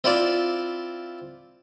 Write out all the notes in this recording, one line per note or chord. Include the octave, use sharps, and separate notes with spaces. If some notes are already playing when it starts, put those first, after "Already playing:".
C4 E4 F4 D5